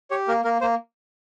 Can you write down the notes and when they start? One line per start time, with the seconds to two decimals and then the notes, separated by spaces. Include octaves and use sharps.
0.10 G4 C#5
0.28 A#3 A#4
0.44 A#3 A#4
0.61 A#3 C5